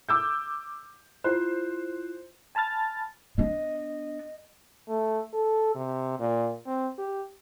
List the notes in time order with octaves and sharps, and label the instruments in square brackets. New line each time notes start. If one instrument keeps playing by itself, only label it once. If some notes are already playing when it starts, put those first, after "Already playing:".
[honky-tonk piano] D6 E6 G6
[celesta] E4 F4 F#6 [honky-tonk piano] C5
[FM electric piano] G#5 A5 B5 F6 A6
[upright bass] B3 D4 [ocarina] D#5
[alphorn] A3
A4
C3
A#2
C4
G4